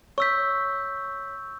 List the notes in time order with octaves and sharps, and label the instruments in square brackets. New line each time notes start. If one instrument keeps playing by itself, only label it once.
[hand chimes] C#5 B6 [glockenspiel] C#6 E6 G6